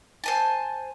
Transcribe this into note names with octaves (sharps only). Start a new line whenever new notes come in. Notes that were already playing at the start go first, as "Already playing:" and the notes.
C5 G#5 A5